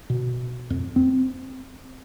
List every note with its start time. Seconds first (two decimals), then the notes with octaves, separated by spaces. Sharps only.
0.10 B2
0.70 F2
0.96 C4